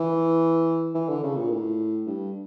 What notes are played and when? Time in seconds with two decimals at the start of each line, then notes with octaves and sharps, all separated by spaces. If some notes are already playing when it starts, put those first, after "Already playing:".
Already playing: E3
0.95 E3
1.09 D3
1.23 C#3
1.37 A#2
1.51 A2
2.06 G2